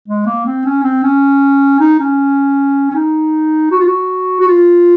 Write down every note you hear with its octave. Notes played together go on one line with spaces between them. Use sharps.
G#3
A#3
C4
C#4
C4
C#4
D#4
C#4
C#4
D#4
F#4
F4
F#4
F#4
F4